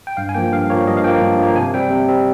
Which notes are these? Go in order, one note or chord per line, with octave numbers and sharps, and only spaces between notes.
G5
G2 F5
G#5
F3 A#3 G5
G2 F5
F3 A#3 C#5
G2 D#5
F5
F3 A#3 G5
G2
F3 A#3
C3 G#5
G3 C4 G5
C3
G3 C4